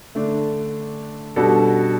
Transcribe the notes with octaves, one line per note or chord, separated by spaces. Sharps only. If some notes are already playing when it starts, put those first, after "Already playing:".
D3 A3 D4
B2 G3 D4 F#4 A4